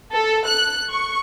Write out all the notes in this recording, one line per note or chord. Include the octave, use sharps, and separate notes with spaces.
A4
F#6
C#6